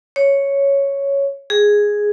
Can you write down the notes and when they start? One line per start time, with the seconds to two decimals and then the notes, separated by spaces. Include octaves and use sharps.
0.16 C#5
1.50 G#4